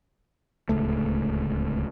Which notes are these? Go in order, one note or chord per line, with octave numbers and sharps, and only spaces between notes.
D1 C#2 A3